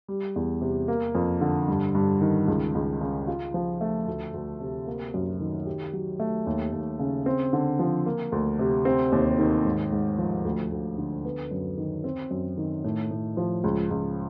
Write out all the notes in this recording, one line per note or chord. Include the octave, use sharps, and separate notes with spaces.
G3
E2
C3
A#3
F2
D3
G2
G2
D#3
C#2
C#2
C#3
F4
F3
A3
D2
D2
C3
A#3
F#2
D#3
G4
F#3
A3
D#2
D#2
C#3
C4
D3
F3
A#3
D2
C3
C4
D#2
D#3
G#2
G#2
F3
D2
D2
D3
B3
F#2
D#3
C4
F#2
D#3
A2
A2
F3
C#2
C#2